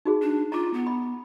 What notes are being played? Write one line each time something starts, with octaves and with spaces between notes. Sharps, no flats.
D#4 F#4 G#4
D4
F4 A#5 D6
B3
B5